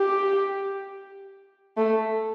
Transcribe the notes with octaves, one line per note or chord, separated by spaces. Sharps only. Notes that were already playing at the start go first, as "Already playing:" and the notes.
Already playing: G4
A3